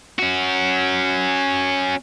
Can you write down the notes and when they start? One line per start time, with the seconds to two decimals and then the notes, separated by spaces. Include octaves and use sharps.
0.19 C#4 F#4